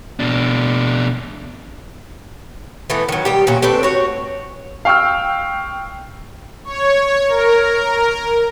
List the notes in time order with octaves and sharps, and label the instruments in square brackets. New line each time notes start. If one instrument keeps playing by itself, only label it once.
[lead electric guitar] B2 D4
[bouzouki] E3 A3 B3
D#3 F#3
D#3 G3 G4
A#2 C#4 F#4
A3 C4 D4 B4
F#4 C#5
[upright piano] F5 G5 C#6 E6 F6
[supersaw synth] C#5
A#4